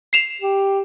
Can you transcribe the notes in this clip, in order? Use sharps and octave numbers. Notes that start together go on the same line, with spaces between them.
C7 E7 F7
G4